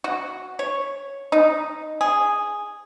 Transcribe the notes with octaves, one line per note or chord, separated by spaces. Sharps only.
F#4
C#5
D#4
G#4